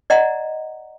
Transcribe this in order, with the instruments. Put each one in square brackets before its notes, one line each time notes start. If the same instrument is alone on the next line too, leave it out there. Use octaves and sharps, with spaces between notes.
[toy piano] D5 D#5 F#5 A#5